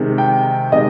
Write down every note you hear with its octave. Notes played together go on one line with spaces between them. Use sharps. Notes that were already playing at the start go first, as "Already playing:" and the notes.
Already playing: C3 D#3 G#3
G5
C3 D#3 G#3 D#5